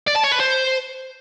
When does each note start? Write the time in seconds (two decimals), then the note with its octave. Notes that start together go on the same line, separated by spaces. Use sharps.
0.07 D5
0.15 A5
0.23 C#5
0.32 B4
0.40 C5